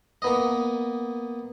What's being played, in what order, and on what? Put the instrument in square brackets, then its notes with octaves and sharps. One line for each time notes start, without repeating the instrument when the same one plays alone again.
[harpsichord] A#3 B3 D#5